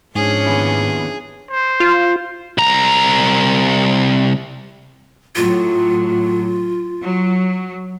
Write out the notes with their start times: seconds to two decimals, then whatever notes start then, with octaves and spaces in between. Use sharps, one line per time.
0.15 G#2 F3 C#4 D4 G#4
0.46 D#2 B3 E4
1.51 C5
1.80 F4
2.58 C2 A#5
5.35 A2 F#3 F4
7.01 F#3